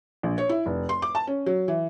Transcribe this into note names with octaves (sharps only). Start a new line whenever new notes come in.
A#1
C#5
E4
F1
C6
D6
A5
C#4
F#3
E3